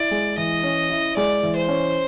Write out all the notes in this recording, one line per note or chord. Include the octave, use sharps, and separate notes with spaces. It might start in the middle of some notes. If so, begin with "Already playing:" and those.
Already playing: E4 D5
G#3
E3 D#5
C#4
E4
G#3 D5
E3
C5
C#4